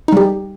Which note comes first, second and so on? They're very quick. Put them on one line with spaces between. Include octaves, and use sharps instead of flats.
D#4 G3 G4